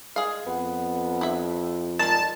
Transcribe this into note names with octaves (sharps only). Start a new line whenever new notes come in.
G#3 G#4 F5
F2 B3
E4 E5
A#2 D#3 G#3 A#4 A5